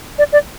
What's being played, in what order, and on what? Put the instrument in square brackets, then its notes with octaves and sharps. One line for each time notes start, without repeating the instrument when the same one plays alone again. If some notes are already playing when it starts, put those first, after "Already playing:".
[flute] D5
D5